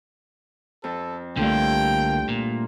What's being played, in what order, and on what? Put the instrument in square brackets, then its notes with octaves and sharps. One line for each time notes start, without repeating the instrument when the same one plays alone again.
[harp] F2 [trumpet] A4
[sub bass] C2 [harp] G2 A3 F4 [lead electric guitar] D3 A#3 [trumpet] G5
[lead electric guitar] A#2